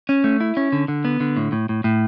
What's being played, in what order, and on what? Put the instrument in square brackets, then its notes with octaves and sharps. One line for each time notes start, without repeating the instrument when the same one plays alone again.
[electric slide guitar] C#4
A3
E4
C#4
D3
D3
B3
D3
A2
A2
A2
A2